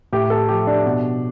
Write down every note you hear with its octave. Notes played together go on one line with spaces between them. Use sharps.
A2 G4
A4
F3 G4
D4
B2